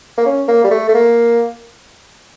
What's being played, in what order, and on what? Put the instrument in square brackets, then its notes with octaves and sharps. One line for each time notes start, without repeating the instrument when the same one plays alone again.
[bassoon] A#3
C#4
A#3
G3
A3
A3
A#3